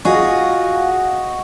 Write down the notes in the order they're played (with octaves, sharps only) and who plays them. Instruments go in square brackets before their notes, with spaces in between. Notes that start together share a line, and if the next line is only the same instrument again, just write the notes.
[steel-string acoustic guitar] F4 G#4 [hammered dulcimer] F#4 D#5